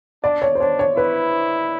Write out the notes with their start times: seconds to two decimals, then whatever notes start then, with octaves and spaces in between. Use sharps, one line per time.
0.24 D4 D5
0.42 C#5
0.55 C5
0.60 D4 C#5
0.79 C#5
0.97 E4 B4